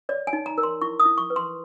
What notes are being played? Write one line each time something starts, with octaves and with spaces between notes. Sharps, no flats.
C#5 D5
G#5
D#4
A#5
A#4
C6
E4 C#6
D#6
E4
C#6
B4
C6